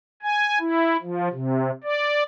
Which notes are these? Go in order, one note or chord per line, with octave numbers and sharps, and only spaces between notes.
G#5
E4
F3
C3
D5